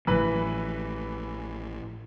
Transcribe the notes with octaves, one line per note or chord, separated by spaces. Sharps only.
A1 A2 E3 F3 B4